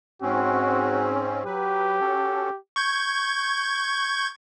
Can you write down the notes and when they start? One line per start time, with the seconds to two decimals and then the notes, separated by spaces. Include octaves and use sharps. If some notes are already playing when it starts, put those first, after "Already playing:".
0.22 G#2 C4 C#4 F#4
1.45 F#3 G4 B4
2.01 C#4 F#4 A4
2.76 C#6 G6 G#6